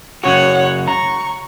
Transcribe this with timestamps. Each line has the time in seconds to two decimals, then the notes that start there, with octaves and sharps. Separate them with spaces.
0.24 F#2 C#3 F#4 C#5 F#5
0.88 A#5 C#6